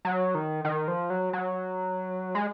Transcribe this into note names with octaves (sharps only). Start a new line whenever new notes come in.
F#3
D#3
D#3
F3
F#3
F#3
G#3